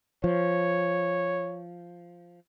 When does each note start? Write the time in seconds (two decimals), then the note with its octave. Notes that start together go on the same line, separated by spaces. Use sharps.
0.24 F3 C#5